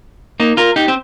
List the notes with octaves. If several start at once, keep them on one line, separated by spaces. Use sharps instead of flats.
A#3 D#4
F4 A#4
D#4 G4
C4